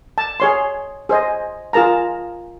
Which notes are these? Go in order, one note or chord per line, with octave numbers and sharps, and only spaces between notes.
A5
G#4 C#5 C6
G#4 C5 D#5
F4 G#4 A#4 A5 A#5